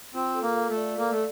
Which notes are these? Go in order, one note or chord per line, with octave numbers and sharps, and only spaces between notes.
C4 F4
A4
A#3
F5
A3
D5
A#3 A4
A3